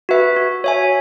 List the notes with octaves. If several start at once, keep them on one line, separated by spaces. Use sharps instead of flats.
F#4 B4 E5
F#4
C#5 E5 G#5